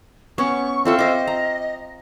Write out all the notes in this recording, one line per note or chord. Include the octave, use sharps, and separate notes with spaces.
B3 C#4 C#6
C4 F4 A4 E5
C5 D#5 D6
A#5